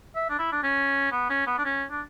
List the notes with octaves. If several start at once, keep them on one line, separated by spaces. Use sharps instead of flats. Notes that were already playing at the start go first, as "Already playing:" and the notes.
E5
D4
E4
D4
C#4
B3
C#4
B3
D4
C#4
D4